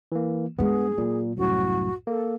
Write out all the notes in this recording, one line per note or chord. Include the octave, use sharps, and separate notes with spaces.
E3 A#3
G2 G#3 B3 G#4
A#2 F#3
C2 F#2 A2 F#4
A#3 A4